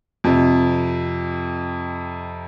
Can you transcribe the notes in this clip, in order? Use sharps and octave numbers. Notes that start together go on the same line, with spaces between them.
F2 C3